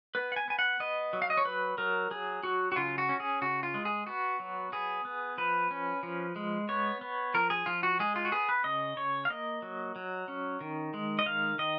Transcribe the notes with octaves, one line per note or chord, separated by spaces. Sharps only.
B3 B4
F#5
G#5
B3 G#5
F#5
B3 D#5
F#3
F5
D#5
C#5
F#3 B4
F#3 A#4
F#3 G#4
F#3 F#4
F#4
C#3 F4
F#4
C#4
G#4
C#3 F#4
F4
G#3
G#4
B3 F#4
F#3
B3 G#4
B3
F3 B4
C#4
F3
G#3
B3 C#5
B3
F3 A#4
G#4
F3 F4
F#4
G#3 G#4
F4
F#4
B3 G#4
B4
C#3 D#5
C#3 C#5
F5
A#3 D#5
F#3
F#3
C#4
D#3
G#3
D#5
D#3 F5
D#3 D#5